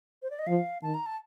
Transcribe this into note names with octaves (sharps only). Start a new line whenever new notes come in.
C5
D5
D#5
F3 F5
D#3 A5
A#5
A5